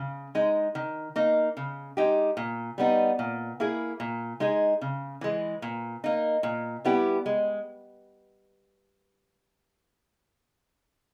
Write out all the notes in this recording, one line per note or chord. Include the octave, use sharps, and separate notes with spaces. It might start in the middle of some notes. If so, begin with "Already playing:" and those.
Already playing: C#3
G#3 D#4
D#3
A#3 D#4
C#3
G#3 D#4 G4
A#2
G3 B3 D#4
A#2
A#3 E4 G#4
A#2
G#3 D#4 G#4
C#3
E3 G#3
A#2
A#3 D#4
A#2
G3 B3 E4 G4
G#3